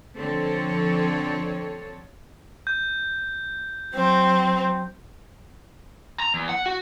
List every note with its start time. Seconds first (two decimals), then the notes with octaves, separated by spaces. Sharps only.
0.18 F2 D3 F3 C4 A4 C#5
2.67 G6
3.94 F#3 C4
6.20 A#5
6.34 E2
6.49 F#5
6.66 F#4